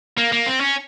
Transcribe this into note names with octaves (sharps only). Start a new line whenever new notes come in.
A#3
A#3
C4
C#4